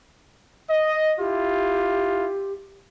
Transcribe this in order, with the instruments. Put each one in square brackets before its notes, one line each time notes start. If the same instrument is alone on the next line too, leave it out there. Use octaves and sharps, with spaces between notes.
[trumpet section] D#5
[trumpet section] E4 F4 [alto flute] G4